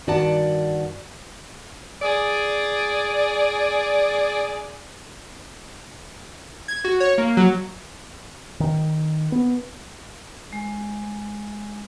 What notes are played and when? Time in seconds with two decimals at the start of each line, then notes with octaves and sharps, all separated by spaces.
0.07 G2 D#3 F#4 D5 F#5 A5
2.02 G#4 D5
6.68 G#6
6.85 F#4
7.00 C#5
7.18 A#3
7.37 F#3
8.60 D#3
9.32 B3
10.53 G#3